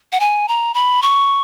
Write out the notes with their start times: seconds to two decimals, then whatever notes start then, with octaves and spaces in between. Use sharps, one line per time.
0.12 F#5
0.20 G#5
0.48 A#5
0.74 B5
1.02 C#6